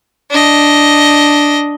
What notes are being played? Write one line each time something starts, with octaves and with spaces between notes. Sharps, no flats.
D4 D#5